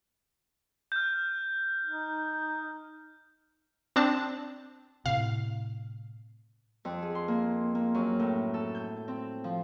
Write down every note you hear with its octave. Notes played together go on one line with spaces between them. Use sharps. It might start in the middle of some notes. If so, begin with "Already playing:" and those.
F6 G6
D#4
C4 D4 A5
A2 C3 F5
F2
G#4
C6
A#3
A#3
F#2
A2
A4
G6
C4
F3